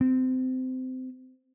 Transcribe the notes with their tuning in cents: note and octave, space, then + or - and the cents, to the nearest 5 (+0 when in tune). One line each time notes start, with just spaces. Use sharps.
C4 -25